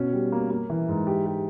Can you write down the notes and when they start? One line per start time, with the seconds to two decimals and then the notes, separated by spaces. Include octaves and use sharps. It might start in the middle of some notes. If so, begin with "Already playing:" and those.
Already playing: B2 C#4
0.13 G3
0.32 A#3
0.50 A#3
0.70 E3
0.88 G#2
1.07 G4
1.26 G4